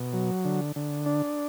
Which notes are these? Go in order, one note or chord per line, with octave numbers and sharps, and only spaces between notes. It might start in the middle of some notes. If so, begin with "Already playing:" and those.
Already playing: B2
F#3
D3
D3
D4